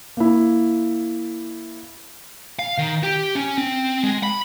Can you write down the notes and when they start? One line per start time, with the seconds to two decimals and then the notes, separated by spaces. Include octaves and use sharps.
0.17 A#3 E4
2.59 F5
2.78 D#3
3.03 G4
3.35 C#4
3.58 C4
4.03 G#3
4.23 B5